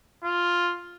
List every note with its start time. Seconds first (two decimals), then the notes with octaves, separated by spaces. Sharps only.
0.24 F4